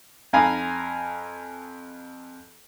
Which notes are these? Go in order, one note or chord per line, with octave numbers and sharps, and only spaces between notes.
F2 F5 G#5 A#5 B5